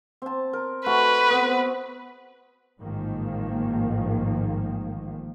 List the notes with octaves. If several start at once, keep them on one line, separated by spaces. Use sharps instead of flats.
C4 A5
A#4
A3 F#4 B4
B3 C4
A1 G#2 D#3 F3 A#3